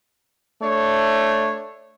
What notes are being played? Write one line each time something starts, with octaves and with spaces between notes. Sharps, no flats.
A3 D4 C#5